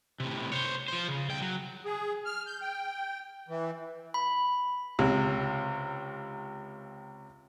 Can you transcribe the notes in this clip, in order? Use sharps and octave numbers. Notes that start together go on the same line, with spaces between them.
A2 C3
C5 C#5
F3 C5
C#3
C2 G5
F#3
G#4
F6
G6
G5
E3
B5
C#2 C3